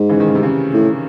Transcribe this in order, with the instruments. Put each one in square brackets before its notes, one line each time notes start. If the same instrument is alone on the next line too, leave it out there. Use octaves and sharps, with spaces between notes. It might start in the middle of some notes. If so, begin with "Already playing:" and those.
Already playing: [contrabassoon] G#2
[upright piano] C#3 E3
D#3
C#3
C3
C#3
[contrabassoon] A2